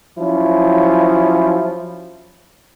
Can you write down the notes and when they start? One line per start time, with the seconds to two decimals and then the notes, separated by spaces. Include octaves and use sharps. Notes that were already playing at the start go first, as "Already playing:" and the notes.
0.18 F3 F#3 C#4 E4